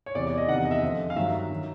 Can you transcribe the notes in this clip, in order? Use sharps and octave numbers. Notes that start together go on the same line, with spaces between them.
C#5
E2 C3 E3 D5
D5
D#5
E2 C3 D#3 F#5
D#5
E5
F2 D3 F3 D#5
F5
G2 D#3 F#3 E5
D#3 F#3